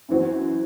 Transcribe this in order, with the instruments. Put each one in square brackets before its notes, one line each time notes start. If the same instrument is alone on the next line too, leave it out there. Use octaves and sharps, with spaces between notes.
[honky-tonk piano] F#2 E3 C4 F#4